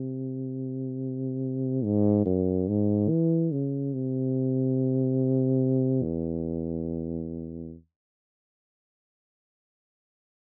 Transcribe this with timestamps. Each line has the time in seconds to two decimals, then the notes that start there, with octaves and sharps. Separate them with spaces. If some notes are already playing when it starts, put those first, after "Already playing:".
Already playing: C3
1.84 G#2
2.25 F#2
2.68 G#2
3.09 E3
3.52 C#3
3.93 C3
6.03 E2